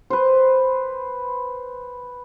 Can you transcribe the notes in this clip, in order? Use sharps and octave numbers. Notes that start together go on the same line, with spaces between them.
B4 C5